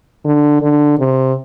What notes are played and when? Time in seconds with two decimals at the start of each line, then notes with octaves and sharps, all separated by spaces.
0.25 D3
0.62 D3
0.99 C3